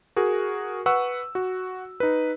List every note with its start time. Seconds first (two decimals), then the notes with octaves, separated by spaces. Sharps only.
0.16 F#4 G#4 A#4
0.86 B4 F#5 C#6 E6
1.35 F#4
2.00 D#4 B4